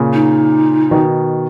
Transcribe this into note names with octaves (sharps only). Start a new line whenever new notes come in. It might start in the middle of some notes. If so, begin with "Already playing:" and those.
Already playing: A#2 C#3
D#4
B2 D#3